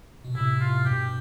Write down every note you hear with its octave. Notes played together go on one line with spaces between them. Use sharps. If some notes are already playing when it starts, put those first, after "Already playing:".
B2
A2 C3 E4
F4
G2 B2 G4